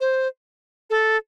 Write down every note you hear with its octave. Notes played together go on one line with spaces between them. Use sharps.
C5
A4